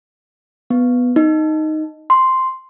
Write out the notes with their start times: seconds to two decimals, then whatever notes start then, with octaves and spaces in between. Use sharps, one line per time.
0.70 B3
1.16 D#4
2.10 C6